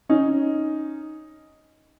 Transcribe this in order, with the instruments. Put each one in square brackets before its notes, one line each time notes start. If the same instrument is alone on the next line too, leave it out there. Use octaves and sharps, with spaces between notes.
[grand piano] C#4 D#4